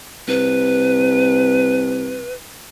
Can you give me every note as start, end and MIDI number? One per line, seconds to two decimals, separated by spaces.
0.28 2.27 36
0.28 2.33 71